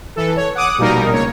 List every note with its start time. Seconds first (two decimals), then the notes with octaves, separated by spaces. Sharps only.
0.16 E3 A4
0.37 C#5
0.55 F#5 D6 D#6
0.78 A#1 B2 G3 A#3 D#4 A#4
1.12 C#2 C#5